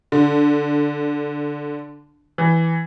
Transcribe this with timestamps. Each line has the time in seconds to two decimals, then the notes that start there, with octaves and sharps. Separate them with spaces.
0.12 D3
2.38 E3